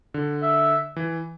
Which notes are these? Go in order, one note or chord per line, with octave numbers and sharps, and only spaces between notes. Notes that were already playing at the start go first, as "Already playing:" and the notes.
D3
E5
E3